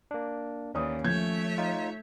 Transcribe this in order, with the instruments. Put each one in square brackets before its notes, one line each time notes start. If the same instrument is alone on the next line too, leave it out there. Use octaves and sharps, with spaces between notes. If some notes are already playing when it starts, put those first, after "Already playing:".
[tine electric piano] A#3 D4
[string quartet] D#2 E3 [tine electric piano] C#4 [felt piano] D5 D#6
[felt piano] F3 G6 G#6 [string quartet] A3 C#5 E5
[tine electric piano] D#4 F4